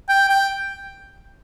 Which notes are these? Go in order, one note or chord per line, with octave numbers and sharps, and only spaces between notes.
G5
G5